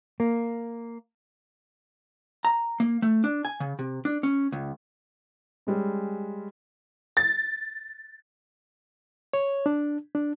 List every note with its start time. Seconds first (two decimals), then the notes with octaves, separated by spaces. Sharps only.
0.20 A#3
2.45 A#5
2.80 A#3
3.02 A3
3.24 D4
3.45 G#5
3.60 C#3
3.79 C3
4.05 D4
4.23 C#4
4.52 C#2
5.67 G3 G#3 C#4
7.17 A6
9.33 C#5
9.66 D4
10.15 D4